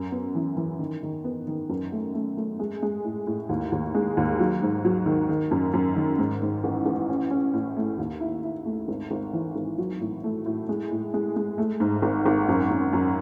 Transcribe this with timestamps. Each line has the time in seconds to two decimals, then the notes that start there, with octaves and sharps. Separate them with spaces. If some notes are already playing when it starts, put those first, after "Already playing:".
Already playing: F#2
0.12 B3
0.35 E3
0.57 E3
0.79 D#3
1.03 D#3
1.24 B3
1.47 D#3
1.69 F#2
1.92 A3
2.14 A3
2.37 A3
2.59 G#3
2.82 G#3
3.04 A2
3.27 A2
3.49 D#2
3.72 D#2
3.94 G#3
4.17 D#2
4.39 F#3
4.62 G#2
4.85 F#3
5.06 D#3
5.29 D#3
5.51 F#2
5.73 F#2
5.96 D#3
6.18 G#2
6.42 G#2
6.64 A1
6.86 A1
7.09 C#4
7.31 C#4
7.53 A2
7.76 A3
7.98 D#2
8.20 E4
8.43 E4
8.66 A3
8.88 G#1
9.11 G#1
9.33 E3
9.56 G#1
9.78 F#3
10.00 A2
10.24 A3
10.46 A2
10.69 G#3
10.91 A2
11.14 G#3
11.36 G#3
11.58 A3
11.80 G#2
12.02 G#1
12.26 G#1
12.48 F#2
12.70 F#2
12.93 F#2